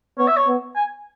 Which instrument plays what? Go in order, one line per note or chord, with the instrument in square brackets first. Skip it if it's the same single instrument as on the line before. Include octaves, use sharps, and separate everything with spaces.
[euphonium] B3 [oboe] C#5
[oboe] E5
C#5
[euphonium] B3
[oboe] G#5